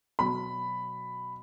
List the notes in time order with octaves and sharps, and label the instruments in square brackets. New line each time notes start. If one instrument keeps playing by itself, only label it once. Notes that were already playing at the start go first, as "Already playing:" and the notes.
[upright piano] B2 F#3 B5